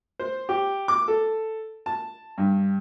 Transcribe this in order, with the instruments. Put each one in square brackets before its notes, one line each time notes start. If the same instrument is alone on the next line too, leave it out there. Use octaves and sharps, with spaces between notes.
[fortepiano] C5
G4
D6
A4
A5
G2